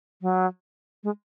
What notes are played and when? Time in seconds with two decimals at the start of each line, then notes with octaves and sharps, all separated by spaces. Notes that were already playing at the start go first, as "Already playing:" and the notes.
0.22 F#3
1.04 G#3